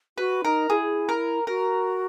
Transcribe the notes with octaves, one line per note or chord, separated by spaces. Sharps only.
F#4 B4
D#4 A#4
E4 G#4
A#4
F#4 A#4